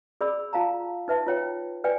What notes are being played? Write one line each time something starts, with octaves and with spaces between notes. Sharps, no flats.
G#4 D5 B5 E6
F4 F5 A5 A#5
D#4 B4 E5 A5
F4 C#5 G5
B4 D5 G5 G#5